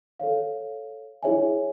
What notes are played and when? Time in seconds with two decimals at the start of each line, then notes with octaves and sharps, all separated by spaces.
0.20 A4 C#5 F5
1.23 E4 G#4 C#5 E5 G#5